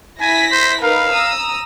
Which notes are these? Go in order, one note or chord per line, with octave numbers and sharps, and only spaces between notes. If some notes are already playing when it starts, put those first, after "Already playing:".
E4 G#5 A#6 B6
C5
D#4 A#4 B4 F5
A#5 D#6 E6